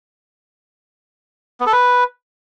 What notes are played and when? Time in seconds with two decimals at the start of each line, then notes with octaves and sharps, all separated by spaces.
1.60 B3
1.66 A4
1.72 B4